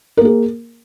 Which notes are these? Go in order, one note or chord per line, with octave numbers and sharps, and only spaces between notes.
A#3 G#4 A#4